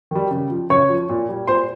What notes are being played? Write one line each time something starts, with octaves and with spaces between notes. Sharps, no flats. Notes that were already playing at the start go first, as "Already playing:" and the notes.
D#3 G3
C#3
F3
C#3 C#5 C#6
F3
A#2
G3
A#2 C5 C6